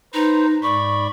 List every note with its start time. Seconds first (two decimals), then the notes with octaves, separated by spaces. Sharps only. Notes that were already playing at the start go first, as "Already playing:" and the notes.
0.14 D#4 B4 C5 A#5
0.63 G#2 D5 B5 C#6